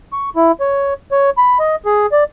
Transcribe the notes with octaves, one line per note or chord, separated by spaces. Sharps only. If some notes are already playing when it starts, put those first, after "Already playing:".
C#6
E4
C#5
C#5
B5
D#5
G#4
D5